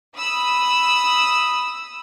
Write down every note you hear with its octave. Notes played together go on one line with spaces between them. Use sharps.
B5 D#6 E6